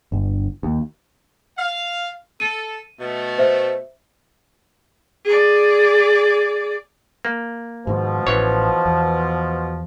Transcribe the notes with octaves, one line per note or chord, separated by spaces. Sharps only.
G1
D#2
F5
A4 D#7
B2 A3
C5 E5
G#4 D5
A#3
G#2 B2 D#3 F3
A1 E3 C#5
E2